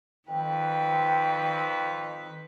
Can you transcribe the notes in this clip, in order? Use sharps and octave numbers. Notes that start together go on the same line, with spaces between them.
F2 D#3 B4 G5